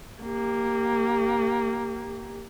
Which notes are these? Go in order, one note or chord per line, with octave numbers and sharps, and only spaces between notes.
A#3 G4